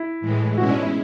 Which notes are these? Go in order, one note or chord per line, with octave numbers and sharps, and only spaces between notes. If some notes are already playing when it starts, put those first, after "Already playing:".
Already playing: E4
A2 E3 G#3
B2 G#3 C#4 E4 F#4
D4
E4